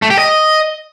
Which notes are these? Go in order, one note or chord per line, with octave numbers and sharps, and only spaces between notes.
A3
G4
D#5